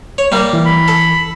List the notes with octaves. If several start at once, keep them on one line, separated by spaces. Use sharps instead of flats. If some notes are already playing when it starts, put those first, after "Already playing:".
C#5
G3 A#3
E3
B5
A4